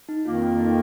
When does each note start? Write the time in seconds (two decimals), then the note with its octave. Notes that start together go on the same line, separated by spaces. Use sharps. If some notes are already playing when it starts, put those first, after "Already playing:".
0.09 D#4
0.25 F2 D#3 A#3 F4
0.42 F4
0.59 D#4